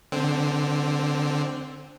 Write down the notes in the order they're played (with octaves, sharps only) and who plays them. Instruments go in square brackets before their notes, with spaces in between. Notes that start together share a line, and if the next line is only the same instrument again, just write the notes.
[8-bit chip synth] D3 C4